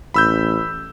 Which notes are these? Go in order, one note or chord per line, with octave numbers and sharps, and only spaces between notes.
A1 B5 E6 G6